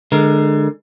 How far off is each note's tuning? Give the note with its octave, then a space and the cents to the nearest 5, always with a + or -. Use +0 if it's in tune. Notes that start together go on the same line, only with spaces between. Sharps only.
D3 +25 G#3 +20 A#4 +5